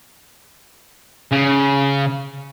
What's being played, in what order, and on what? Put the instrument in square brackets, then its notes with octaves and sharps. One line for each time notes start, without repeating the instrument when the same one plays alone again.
[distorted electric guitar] C#3